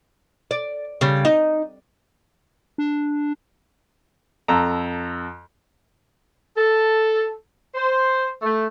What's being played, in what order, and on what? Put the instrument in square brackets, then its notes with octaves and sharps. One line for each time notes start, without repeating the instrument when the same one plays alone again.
[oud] D5
C#3 G3
D#4
[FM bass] D4
[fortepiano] F2 A4 A#5
[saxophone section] A4
C5
A3